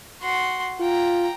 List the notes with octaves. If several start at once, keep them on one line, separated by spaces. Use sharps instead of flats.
F#4 C6
F4 G5 A#5